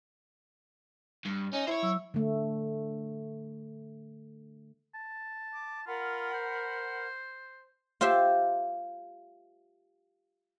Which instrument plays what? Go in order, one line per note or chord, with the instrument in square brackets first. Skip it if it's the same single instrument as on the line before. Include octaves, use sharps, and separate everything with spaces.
[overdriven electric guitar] G2
[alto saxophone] C#4 [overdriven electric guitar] D#4
[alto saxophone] E4 [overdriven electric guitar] C5 C#5
[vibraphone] F#3 E6
[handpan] D3 A3
[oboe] A5
[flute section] D6
[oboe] F4 [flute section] A#4 F#5 B5
[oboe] C5
[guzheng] F4 G4 C5 E5